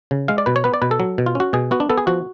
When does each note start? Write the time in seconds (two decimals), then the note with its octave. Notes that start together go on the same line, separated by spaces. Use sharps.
0.11 C#3
0.28 G#3 F5
0.38 D5
0.46 B2 B4
0.56 C#5
0.64 B3 B4
0.74 D5
0.82 B2 B4
0.91 A4
1.00 F#3
1.18 B2
1.26 F4
1.35 C#4 F#4
1.53 B2 G#4
1.71 B3 F#4
1.80 D4
1.90 B3 A4
1.98 G#4
2.07 F3 F#4